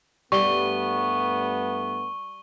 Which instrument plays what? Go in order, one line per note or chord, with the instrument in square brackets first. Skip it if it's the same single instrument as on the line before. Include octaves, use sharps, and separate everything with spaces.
[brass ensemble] G2 A3 B3 [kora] G3 [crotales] C#6 G7